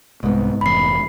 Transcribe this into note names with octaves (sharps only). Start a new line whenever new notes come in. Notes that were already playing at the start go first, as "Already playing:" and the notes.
C2 G#2 B3
F1 E3 B5 C7